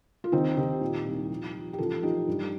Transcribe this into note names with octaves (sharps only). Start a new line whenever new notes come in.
F4
D#2 C4 D#4
D#2 D#4 G4
A#2
C2
F3
F3
G4
A1 F4 A4
F3 D#4 G4
G2